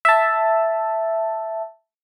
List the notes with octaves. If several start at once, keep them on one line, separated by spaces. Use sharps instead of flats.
E5 A5